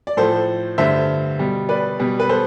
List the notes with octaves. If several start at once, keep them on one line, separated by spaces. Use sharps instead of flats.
D5
A2 F3 A3 A4 C5
G2 D3 A3 C5 E5
B2 G3
B4 D5
B2 G3
B4
A4 C5